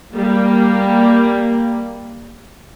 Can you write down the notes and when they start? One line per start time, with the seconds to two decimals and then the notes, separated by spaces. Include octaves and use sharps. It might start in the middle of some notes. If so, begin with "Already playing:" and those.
0.12 G3 A#3